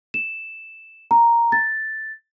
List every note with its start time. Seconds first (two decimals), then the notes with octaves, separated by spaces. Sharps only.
0.14 E7
1.11 A#5
1.52 A6